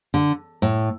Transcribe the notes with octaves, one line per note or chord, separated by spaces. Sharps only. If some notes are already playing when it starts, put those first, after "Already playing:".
D3
A2